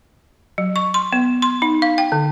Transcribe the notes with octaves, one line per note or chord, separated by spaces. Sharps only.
F#3
C#6
C6
B3
C6
D#4
F5
G5
D3